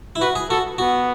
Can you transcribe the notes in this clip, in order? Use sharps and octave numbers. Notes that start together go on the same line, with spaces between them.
E4
F#4 B4
G#4
F#4 A4
B3 F#4